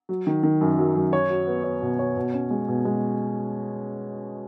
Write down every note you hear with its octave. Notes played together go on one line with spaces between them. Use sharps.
F#3
D#3
D#3
F#2
F#3
F#2
C#5
F#4
B3
C#5
B2
C#5
B2
C#4
G#3
B2
G#3